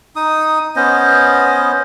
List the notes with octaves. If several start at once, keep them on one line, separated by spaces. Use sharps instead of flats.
D#4 D#6
B3 C#4 C5 D#5